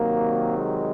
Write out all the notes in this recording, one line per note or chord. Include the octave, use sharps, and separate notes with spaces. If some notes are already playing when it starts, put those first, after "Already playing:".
Already playing: C3 D#3 F#3 A#3
G#3